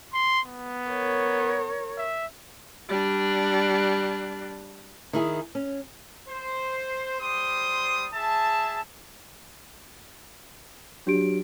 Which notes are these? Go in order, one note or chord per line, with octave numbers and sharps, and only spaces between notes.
C6
B3
A#4 C#5
E5
G3 D4
D#3 E4 G#4
C#4
C5
G3 C5 C6 D#6
G#4 E5 A5
F#3 D4 G4 D7